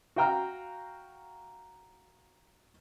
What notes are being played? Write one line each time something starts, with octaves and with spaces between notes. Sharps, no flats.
F#4 F5 G5 A#5 F6